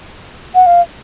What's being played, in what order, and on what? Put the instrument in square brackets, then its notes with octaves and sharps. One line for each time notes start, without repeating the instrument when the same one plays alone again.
[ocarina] F#5
F5